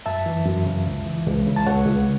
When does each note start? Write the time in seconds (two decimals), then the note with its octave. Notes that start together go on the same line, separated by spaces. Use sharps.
0.06 F#2 E5 A5
0.26 E3
0.46 F#2
0.66 C#3
0.86 C#2
1.06 E3
1.26 C#2
1.47 C#3
1.56 A5
1.66 C#2 C#5 F#5
1.86 C#2